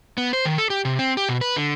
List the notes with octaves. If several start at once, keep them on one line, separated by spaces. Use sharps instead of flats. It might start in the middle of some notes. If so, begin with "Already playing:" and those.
B3
C5
D#3
A4
G4
C3
C4
G4
B2
B4
D3